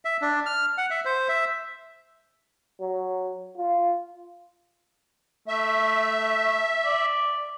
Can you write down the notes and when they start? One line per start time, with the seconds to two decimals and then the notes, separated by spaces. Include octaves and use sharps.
0.05 E5
0.22 D4
0.46 F6
0.78 F#5
0.90 E5
1.05 C5
1.29 E5
2.80 F#3
3.57 F4
5.48 A3 E5
6.85 D5